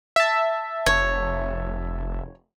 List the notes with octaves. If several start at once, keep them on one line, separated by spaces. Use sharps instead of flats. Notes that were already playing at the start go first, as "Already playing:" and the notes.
E5 A5
F1 C#5